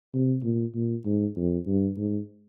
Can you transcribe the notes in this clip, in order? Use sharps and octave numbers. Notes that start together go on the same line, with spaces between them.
C3
A#2
A#2
G#2
F2
G2
G#2